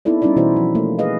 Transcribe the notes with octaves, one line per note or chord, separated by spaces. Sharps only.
B3 C4 D#4 E4 A4 D5
G3 C#4 D#4 E4 D5
B2 E3 E4 F#4 C5 D5
F3
A3 A#3
G#4 B4 D#5 F5